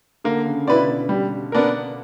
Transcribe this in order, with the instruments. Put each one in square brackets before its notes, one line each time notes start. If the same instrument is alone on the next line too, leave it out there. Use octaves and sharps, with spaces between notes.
[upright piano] D3 [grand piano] A#3
[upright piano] C#3
[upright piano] B2 [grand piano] E4 B4 D5
[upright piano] B2
[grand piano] G3
B3 D4 A#4